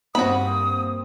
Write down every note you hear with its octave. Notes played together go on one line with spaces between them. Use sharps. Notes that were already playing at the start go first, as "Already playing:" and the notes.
G2 A#3 C4 F#4 B5 D#6